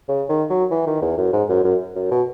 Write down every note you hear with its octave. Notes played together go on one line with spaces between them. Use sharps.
C#3
D#3
F#3
E3
D#3
E2
F#2
G#2
F#2
F#2
F#2
B2